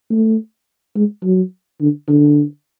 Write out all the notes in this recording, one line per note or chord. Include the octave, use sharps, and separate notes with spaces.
A3
G#3
F#3
D3
D3